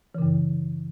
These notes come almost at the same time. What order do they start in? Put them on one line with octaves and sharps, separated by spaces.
E3 C#3 F#2